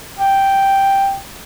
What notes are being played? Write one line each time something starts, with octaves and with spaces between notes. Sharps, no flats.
G5